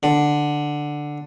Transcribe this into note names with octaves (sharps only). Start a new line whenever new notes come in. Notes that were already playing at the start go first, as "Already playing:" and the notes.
D3